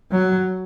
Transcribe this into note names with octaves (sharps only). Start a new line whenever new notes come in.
F#3